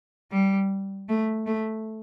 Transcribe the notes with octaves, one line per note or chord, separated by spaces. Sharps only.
G3
A3
A3